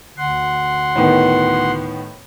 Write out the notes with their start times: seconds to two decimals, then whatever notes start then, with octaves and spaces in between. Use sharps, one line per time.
0.18 D2 F#5 C6
0.96 A2 D#3 B3